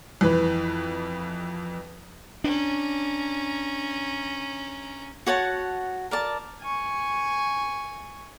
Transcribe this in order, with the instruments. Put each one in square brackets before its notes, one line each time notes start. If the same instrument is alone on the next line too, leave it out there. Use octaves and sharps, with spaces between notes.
[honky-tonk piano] F2 E3 B4
[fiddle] C#4 A#5 [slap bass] D4
[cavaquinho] F#4 C#5 F#5 A5
A#4 D5 A5
[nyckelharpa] G#5 C#6